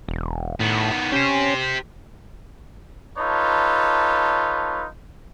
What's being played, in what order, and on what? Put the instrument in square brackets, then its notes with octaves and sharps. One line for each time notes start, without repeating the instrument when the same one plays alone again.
[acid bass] E1
[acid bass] A2 [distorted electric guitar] D#3 B3
[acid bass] C#4 [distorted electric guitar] G4 C5
[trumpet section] D#4 F4 A4 B4 C#5 A5